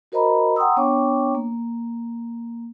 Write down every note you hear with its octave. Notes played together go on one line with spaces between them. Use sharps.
F#4 A#4 C5 D#5 A#5 B5
F#5 G5 A#5 C6 D#6 E6
B3 D4 C#5 G5 C#6 D6
A#3